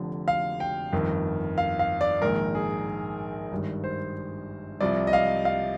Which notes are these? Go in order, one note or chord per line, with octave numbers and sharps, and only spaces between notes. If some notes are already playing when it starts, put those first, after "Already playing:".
Already playing: F1 F2 D3 F3
F5
G5
G1 F2 D#3
F5
F5
D5
A#1 G#2 D#3 A#4
G#4
G#1 G2 D#3
C5
C2 C3 F3 D5
D#5
F5
F5